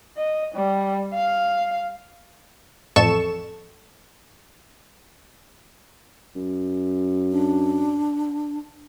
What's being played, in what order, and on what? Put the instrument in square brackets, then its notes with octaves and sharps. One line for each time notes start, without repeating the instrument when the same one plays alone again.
[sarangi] D#5
G3
F5
[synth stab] A1 F2 A4 C#6 E7
[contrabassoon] F#2
[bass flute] D4